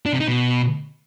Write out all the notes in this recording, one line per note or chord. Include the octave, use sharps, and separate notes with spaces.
D4
C3
D#4
B2